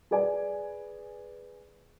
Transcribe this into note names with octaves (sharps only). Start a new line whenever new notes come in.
G#4 B4 D5 G#5